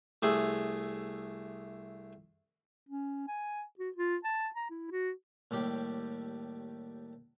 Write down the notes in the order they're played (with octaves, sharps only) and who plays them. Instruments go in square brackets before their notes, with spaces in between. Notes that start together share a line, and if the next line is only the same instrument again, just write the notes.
[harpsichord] C2 A3 G#4
[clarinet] C#4
G#5
F#4
F4
A5
A#5
E4
F#4
[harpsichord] D#2 A2 G3 G4